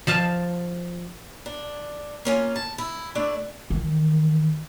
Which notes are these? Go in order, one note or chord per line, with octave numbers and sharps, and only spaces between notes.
F3 F5 A5
D4
A#3 C#4 F4
A5
E4
A3 D4 E4 D5
D#3 E3